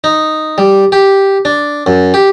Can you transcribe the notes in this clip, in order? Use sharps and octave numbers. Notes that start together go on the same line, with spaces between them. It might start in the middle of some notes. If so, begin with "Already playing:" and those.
D#4
G3
G4
D4
F#2
G4